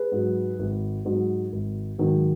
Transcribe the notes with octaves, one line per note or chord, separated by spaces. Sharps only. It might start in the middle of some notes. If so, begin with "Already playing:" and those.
Already playing: G#4 B4
G#2 F#3
G#1
G#2 F#3
G#1
G#2 D#3 F#3